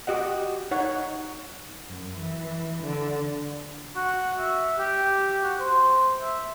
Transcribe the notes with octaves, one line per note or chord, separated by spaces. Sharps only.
F#4 G4 D#5 F#5
D#4 C#5 F#5
F#2
E3
D3
F#4
E5
G4
F#4
C5
E5